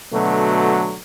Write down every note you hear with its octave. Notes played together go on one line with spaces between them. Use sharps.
B2 D3 F#3 A3